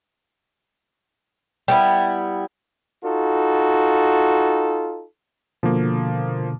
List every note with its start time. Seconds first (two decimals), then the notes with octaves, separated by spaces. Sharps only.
1.68 G3 B3 E4
3.04 D#4 F4 F#4 A4
5.63 B2 D3 F3 A#3